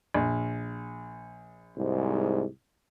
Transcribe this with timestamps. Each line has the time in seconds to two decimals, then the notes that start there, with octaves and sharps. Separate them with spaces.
0.14 A#1
1.77 C2 G#2